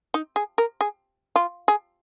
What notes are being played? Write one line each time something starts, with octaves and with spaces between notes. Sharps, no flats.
D#4
G#4
A#4
G#4
F4
G#4